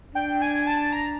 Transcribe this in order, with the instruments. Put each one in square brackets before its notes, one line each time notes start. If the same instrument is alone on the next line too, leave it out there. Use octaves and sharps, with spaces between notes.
[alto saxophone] D4 [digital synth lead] G5
[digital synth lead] G#5
A5
A#5